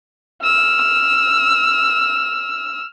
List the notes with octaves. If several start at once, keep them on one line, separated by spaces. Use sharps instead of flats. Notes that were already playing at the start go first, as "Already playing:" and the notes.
E6 F6